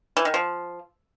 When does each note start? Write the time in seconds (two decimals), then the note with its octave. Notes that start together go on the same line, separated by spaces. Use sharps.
0.17 E3
0.25 D#3
0.34 F3